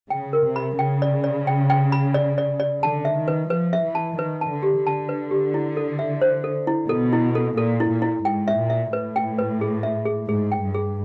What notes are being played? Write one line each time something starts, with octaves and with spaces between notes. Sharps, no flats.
C#3 G5
A#4
C3
B5
C#3 G5
D5
D5
G5
G5
B5
D5
D5
D5
D3 A5
E5
D#3
B4
F3 B4
E5
E3
A5
D#3 B4
A5
D3
G4
D3 A5
B4
G4
E4
A4
E5
C5
A4
E4
B2 A4
E4
A4
A#2 A4
E4
A#2
E4
G#2 G5
E5
A#2
E5
A2 B4
G5
B4
G#4
E5
G#4
G#2 G#4
G5
G2
G#4